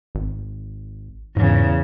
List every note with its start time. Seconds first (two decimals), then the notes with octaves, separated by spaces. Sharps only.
0.15 G#1
1.36 E2 G#2 C#3